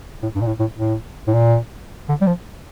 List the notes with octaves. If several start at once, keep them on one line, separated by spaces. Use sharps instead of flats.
A2
G2
A#2
A2
A2
A2
A2
A#2
D3
G3
F3